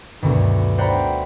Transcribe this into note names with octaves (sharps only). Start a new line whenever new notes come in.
D2 G2 B2 D#3
C5 D5 F#5 G5 A#5 B5